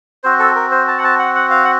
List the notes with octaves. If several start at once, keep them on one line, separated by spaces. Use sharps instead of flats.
C4 F#4 C5
A4
A#4
C5
A5
F#5
A5
F#5
F#5
F5
F#5